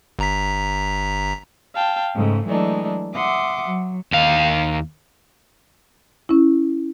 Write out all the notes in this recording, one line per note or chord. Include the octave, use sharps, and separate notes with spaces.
G1 A#5 B6
F5 G5 A5
G#2 C#3 G#3 A3
E3 F#3 G#3 A3 D4 D#4
E5 F#5 C6 D6 D#6
F#3
D#2 F5
C#4 E4